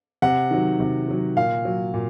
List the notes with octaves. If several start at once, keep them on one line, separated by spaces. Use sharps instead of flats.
C3 F#5
D#3 F#3
C3
D#3 F#3
A#2 F5
F#3
A#2